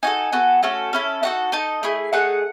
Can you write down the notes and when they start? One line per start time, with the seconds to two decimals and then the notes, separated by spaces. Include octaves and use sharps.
0.03 D#4 F#4 A4 G#5
0.33 B3 F#4 A4
0.63 A3 C#4 F#4 A4
0.93 C#4 E4 A4
1.23 D#4 F#4 A4 F#5
1.52 D#4 A4 D#5
1.83 A3 E4 G#4
2.13 A3 D#4 G#4 F#5